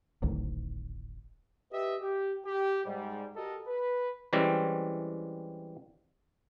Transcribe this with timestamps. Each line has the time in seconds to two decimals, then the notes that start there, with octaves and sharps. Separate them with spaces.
0.22 D1 G#1 D2
1.72 G4 B4 D#5 E5
2.01 G4
2.45 G4
2.85 G#2 G3
3.36 F#4 G4 A4 A#4 D#5
3.67 B4
4.33 E3 G3 G#3 C4 C#4